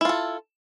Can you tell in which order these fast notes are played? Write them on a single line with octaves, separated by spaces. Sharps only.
E4 F4 A4